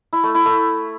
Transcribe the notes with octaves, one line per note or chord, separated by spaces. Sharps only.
E4
A3
E4
A3